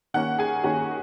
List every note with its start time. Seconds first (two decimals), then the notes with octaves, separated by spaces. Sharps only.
0.14 D#3 A#3 C#4 F#5 F#6
0.38 G#4 G#5
0.64 D#3 A#3 C#4 F#4 F#5